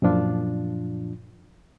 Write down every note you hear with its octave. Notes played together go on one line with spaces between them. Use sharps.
F#2 A#2 F3 D4 F4